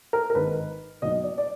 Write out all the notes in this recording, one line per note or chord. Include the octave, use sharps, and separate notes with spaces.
A#4
A#4
G#1 G#2 D#3 B4
B1 B2 D#5
D5
D5